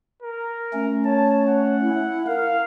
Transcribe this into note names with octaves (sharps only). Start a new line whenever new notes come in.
A#4
A3 C#4
C#5 A5
F#5
E4
A#4 F5